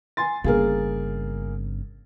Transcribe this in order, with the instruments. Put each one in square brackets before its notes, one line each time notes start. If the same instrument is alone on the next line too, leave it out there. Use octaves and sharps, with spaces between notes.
[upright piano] G#5 C6 A6
[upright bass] G1 C#3 [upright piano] A#3 G#4 A#4